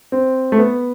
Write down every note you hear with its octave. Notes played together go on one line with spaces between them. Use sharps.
C4
A3
B3